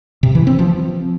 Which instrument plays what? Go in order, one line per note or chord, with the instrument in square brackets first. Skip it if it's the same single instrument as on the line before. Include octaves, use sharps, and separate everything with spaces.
[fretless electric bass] C3
E3
C4
F3